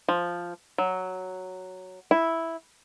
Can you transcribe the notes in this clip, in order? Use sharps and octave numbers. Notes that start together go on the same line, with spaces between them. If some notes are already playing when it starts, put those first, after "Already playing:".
F3
F#3
E4